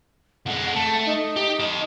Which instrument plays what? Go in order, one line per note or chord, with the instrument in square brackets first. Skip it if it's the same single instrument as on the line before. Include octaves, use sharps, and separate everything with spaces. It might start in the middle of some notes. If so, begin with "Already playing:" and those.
[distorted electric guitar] F2 G#3 [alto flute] F#5
[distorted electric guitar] A3 [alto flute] A5
[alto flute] D#4
[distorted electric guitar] G4
A4 D#5